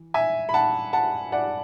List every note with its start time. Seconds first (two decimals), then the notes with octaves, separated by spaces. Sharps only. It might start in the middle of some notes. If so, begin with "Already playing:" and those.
Already playing: E3
0.14 E5 G#5
0.49 B5
0.54 F#5 A5
0.93 F#5 A5
1.32 D5 F#5